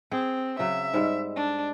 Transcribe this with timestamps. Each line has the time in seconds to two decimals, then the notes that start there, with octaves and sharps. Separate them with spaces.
0.11 C4 G#4 G5
0.59 C#3 F#3 E5
0.94 G#2 G3 G#3
1.36 D4